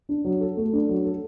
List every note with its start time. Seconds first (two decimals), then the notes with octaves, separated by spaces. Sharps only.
0.09 D4
0.25 F#3
0.41 A4
0.57 A3
0.73 D4
0.89 F#3
1.04 A4